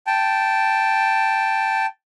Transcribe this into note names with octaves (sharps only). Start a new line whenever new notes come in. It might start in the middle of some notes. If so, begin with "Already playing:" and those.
G5 A5